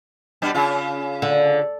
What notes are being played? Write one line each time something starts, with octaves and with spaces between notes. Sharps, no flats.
B2 G3 D4
C#3 F4
D3